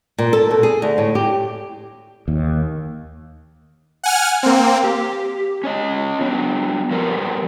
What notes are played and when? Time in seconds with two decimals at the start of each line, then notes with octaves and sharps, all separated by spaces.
0.18 A#2
0.33 A4
0.51 B2
0.63 G#4
0.82 D2
0.98 A2
1.15 G4
2.28 D#2
4.04 F#5 G#5 F6
4.43 A#3 C4
4.84 G4
5.64 C#4 C#5 D#5
6.21 F#3 B3 D4
6.91 F3 G3 B3 A#4